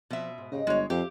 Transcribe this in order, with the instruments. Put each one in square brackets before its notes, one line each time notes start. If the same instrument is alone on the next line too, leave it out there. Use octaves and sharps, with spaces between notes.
[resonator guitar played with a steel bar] B2 E5 [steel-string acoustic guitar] F3 C4
[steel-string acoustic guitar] G#2
[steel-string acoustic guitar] G#2 G4 D#5 [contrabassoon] C#3
[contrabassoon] G1 [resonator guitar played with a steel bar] G#3 C#5
[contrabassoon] F2 [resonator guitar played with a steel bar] G4 [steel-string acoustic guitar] E5 F5